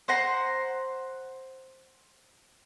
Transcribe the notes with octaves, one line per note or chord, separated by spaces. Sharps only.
C5 F#5 A#5 C6